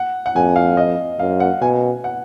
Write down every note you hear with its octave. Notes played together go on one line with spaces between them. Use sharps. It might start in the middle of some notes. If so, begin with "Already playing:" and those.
Already playing: F#5
F#5
F2 G#5
F5
D#5
F#2 F5
F#5
B2 G#5
F#5